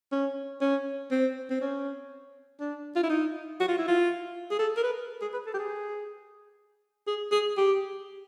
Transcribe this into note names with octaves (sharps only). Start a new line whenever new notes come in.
C#4
C#4
C4
C4
C#4
D4
F4
E4
D#4
F#4
F4
E4
F4
G#4
A4
A#4
B4
G#4
B4
A4
G4
G#4
G#4
G#4
G4